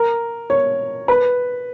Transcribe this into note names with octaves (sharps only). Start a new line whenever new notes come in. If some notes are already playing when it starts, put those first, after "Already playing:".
Already playing: A#4
C#5
B4